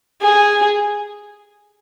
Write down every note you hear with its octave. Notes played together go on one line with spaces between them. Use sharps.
G#4